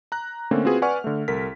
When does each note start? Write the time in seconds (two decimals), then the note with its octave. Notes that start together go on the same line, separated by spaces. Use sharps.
0.12 A#5 F#6
0.51 D3 A3 A#3 C4 C#4
0.65 C4 F4 F#4 G#4 B4
0.82 B4 D5 F#5 G#5 C#6 F6
1.04 D3 A3
1.28 C2 A4 A#4 B6